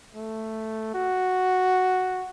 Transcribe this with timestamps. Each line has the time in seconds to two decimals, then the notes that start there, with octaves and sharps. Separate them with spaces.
0.15 A3
0.94 F#4